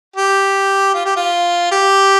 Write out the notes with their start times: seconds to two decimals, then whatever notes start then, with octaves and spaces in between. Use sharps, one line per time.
0.16 G4
0.94 F4
1.05 G4
1.16 F4
1.72 G4